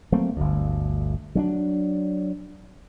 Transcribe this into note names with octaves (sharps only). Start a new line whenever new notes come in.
F#3 A3 A#3 C4
G1 D2
F#3 C#4 D4